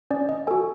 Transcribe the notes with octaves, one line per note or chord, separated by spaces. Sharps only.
C#4 D5
D#5
F#4 A4 G#5